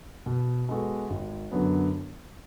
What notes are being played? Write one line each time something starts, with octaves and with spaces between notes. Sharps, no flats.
B2
G#3 B3 F#4 A4
G#1
F#2 D3 F#3 B3